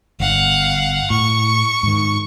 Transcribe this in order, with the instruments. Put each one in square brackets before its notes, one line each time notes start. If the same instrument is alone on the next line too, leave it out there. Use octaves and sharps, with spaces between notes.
[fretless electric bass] G1 [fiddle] F5 F#5
[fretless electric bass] A2 [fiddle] C#6
[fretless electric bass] G#2 D#3